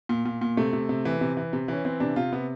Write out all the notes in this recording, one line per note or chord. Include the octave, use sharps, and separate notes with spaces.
A#2
A#2
A#2
C3 A3
C3
C3
E3
C3
E3
C3
E3 C#4
E3 C4
C3 D4
C3 F4
C3 B3